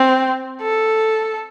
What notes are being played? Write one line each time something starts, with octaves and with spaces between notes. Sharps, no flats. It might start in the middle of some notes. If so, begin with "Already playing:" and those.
Already playing: C4
A4